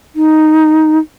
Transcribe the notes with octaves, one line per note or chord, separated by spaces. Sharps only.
D#4